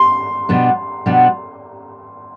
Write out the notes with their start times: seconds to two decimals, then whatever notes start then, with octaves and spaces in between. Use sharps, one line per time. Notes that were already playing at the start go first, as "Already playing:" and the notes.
Already playing: C6
0.49 B2 G3 B3 D4
1.06 B2 G3 B3 D4